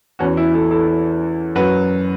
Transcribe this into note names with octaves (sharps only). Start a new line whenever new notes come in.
E2 E3 C#4 F#4
E4
E4 A4
E4 A4
E4 A4
F#2 F#3 F#4 B4